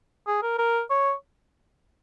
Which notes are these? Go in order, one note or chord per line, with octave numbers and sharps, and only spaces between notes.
G#4
A#4
A#4
C#5